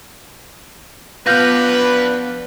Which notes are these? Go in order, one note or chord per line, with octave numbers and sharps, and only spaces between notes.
F3 B3 D4 B4 F5 F6 G6 A#6